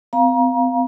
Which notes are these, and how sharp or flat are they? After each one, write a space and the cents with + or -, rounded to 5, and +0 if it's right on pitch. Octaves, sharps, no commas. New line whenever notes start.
C4 -40 F5 +0 A#5 +30